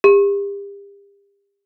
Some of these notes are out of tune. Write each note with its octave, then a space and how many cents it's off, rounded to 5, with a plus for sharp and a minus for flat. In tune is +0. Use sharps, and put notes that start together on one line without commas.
G4 +40